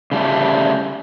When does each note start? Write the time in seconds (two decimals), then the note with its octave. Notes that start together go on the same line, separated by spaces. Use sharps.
0.12 C#3 G3 A3